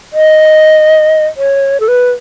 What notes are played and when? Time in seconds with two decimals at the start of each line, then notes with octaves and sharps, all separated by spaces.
0.13 D#5
1.37 C#5
1.80 A4
1.88 B4